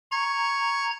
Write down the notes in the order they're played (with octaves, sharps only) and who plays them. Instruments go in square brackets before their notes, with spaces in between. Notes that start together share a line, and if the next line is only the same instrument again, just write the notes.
[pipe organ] A#5 G#6 [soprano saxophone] C#6